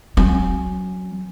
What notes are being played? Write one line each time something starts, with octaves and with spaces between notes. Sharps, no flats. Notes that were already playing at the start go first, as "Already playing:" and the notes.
F#3 C#4